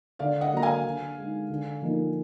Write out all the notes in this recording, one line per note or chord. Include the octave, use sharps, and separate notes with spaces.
D3 D5 F5
D#5 F#5
F#3 A#3 A#5
F5 G#5
D3
G#3 D#4
D3
F3 A#3 D#4